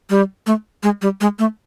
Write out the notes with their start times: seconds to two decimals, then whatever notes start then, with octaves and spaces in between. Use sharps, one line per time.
0.10 G3
0.47 A3
0.83 G#3
1.02 G3
1.21 G#3
1.39 A3